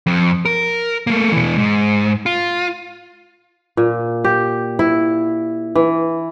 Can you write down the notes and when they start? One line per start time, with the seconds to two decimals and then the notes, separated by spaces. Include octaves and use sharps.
0.07 F2
0.45 A#4
1.07 A3 A#3
1.32 B2 E3
1.58 G#2
2.26 F4
3.77 A#2
4.24 G4
4.79 E4
5.75 E3